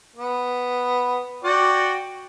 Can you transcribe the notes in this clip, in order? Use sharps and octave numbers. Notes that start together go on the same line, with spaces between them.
B3
F#4 D5 G5